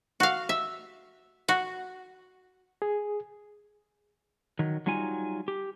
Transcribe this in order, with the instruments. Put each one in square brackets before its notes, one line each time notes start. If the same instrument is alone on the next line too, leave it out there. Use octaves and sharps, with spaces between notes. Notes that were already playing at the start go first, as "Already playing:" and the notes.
[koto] F#4 F5
E5
F#4
[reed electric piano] G#4
[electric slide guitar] D#3 F#3
F#3 G3 D#4 F4 G#5
G4